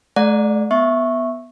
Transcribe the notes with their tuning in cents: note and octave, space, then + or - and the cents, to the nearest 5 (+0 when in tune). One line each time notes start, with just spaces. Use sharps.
A3 -40 D5 +0 F#5 -35
B3 +0 E5 +0 C#6 -15